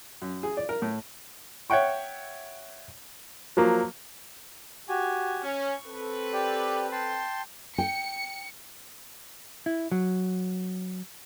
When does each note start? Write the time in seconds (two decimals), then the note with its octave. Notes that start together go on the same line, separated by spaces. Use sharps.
0.22 F#2
0.43 G#4
0.57 D5
0.69 A#4
0.82 A2
1.70 C#5 E5 F#5 G5 C#6
3.57 F3 F#3 A#3
4.89 F#4 G4 G#5
5.43 C#4 C#6
5.86 C4 A4 B4
6.33 G4 D5 G5
6.92 G5 A5 C6
7.78 G5 C#7
9.66 E4
9.92 F#3